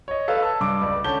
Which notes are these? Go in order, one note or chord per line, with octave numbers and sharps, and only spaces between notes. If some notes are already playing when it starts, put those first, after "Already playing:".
C#5 D#5
A4 B4 F5 A5
A5 E6
G2 D6
C#2 D5
D3 C#4 A5 G6 G7